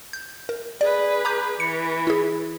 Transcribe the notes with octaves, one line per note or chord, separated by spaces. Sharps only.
G6
A#4
G#4 B4 D5
A#5 D6 G6
E3 C#7
E4 G#4